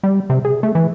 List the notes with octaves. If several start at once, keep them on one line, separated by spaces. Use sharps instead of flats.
G3
C3
G#4
A3
E3